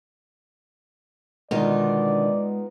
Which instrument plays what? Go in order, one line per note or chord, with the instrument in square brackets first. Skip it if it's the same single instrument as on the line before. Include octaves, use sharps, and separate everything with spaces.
[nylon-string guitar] B2 D3 D#3 [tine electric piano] G#3 [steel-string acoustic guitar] B3 D#4 F4 [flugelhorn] D5